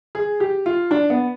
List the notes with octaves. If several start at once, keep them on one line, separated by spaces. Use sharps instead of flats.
G#4
G4
F4
D4
B3